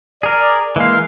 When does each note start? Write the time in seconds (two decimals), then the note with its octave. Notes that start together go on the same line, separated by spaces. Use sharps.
0.23 G#4 A#4 D5
0.76 E3 G#3 A#3 F5